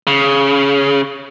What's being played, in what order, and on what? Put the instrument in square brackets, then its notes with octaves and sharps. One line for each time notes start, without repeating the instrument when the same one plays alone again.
[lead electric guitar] C#3